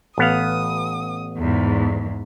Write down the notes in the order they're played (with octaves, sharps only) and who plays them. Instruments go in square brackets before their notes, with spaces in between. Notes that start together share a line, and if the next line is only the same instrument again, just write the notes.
[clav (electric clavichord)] A1 B3 F5 [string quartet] D#6
[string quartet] E2 G#2